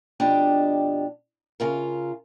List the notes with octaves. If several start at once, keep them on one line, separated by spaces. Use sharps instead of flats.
F2 B2 D4 G4 D#5
C#3 F4 A#4